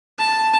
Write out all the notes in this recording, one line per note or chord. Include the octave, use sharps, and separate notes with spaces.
A5